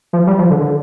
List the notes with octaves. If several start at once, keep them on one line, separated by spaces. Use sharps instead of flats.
F3
G3
F3
D3
D3